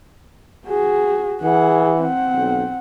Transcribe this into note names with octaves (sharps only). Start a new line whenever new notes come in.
F#4 G#4
E3 G#4 F#5
C4 F#5
B1